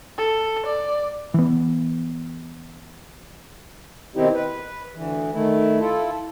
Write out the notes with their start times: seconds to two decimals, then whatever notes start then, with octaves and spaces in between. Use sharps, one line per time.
0.18 A4
0.66 D5
1.34 E3 B3
4.16 B2 D#3 C4 D#4 E4 G4
4.34 B4
4.94 D2 E3
5.33 D#3 A3 E4
5.80 E4 F4 A4